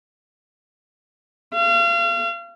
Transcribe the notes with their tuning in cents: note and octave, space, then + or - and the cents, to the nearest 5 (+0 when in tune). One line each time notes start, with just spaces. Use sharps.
F5 -35